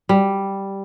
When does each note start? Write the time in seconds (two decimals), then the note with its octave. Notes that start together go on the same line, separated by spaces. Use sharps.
0.09 G3